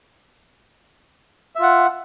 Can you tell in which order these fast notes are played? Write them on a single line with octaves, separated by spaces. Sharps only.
E5 F4 F#5